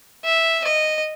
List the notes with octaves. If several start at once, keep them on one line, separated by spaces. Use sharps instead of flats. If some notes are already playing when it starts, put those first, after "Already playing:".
E5
D#5